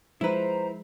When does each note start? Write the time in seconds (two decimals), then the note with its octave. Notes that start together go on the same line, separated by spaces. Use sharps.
0.21 F3 G#3 E4 B4 C5 A#5